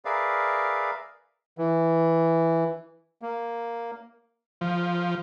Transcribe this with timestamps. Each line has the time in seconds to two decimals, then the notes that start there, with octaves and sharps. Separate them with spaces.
0.05 G#4 A#4 B4 D5 E5 F5
1.58 E3
3.22 A#3
4.61 F3